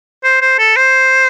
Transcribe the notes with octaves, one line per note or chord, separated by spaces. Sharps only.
C5
C5
A4
C5